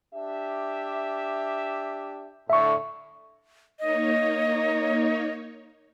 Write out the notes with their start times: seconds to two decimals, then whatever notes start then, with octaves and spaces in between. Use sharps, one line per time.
0.14 D4 G4 E5
2.50 A2 D3 E5 C#6
3.80 A#3 D#4 C#5 D#5